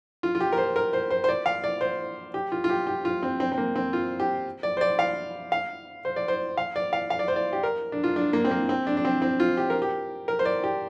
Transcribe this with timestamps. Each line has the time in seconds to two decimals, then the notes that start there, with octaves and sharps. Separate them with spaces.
0.23 F4
0.35 F4
0.40 G4
0.52 A#4
0.58 C5
0.76 A#4
0.93 C5
1.10 C5
1.24 C5
1.29 D5
1.46 F5
1.64 D5
1.81 C5
2.34 G4
2.52 F4
2.64 F4
2.69 G4
2.87 G4
3.05 F4
3.23 C4
3.40 C4
3.52 C4
3.58 A#3
3.76 C4
3.93 F4
4.20 G4
4.63 D5
4.77 C5
4.81 D5
4.99 F5
5.52 F5
6.05 C5
6.16 D5
6.28 C5
6.57 F5
6.76 D5
6.93 F5
7.10 F5
7.19 D5
7.28 C5
7.36 D5
7.53 G4
7.63 A#4
7.92 D4
8.04 F4
8.16 D4
8.33 A#3
8.44 C4
8.51 A#3
8.69 C4
8.87 D4
8.97 D4
9.05 C4
9.22 C4
9.40 F4
9.57 G4
9.70 A#4
9.82 G4
10.28 A#4
10.39 C5
10.45 D5
10.64 G4